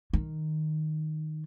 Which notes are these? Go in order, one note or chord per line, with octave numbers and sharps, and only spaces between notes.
D#3